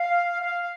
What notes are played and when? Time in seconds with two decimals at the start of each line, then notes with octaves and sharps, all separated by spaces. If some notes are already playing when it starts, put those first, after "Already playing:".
Already playing: F5
0.41 F5